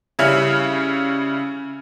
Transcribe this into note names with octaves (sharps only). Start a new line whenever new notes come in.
C#3 G3 C#4 E4 F6